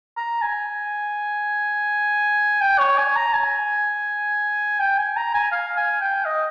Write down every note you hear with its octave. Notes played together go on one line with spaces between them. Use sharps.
A#5
G#5
G5
C#5
G#5
A#5
G#5
G5
G#5
A#5
G#5
F5
G#5
G5
D#5